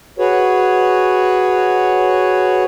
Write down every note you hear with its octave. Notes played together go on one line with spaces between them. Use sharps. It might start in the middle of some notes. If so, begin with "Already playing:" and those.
F#4 G#4 B4 C#5